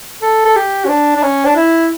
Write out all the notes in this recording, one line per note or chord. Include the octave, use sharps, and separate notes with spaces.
A4
A4
G4
C#4
D4
D4
C#4
D4
E4